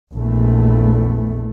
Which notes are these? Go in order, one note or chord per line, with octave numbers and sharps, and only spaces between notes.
A#1 E2 A3